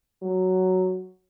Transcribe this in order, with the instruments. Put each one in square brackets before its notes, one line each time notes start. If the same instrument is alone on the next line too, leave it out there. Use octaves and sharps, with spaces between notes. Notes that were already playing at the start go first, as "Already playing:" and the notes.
[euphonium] F#3